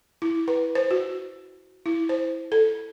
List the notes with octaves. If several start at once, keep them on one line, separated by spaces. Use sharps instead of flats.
E4
B4
C5
F#4
E4
C5
A4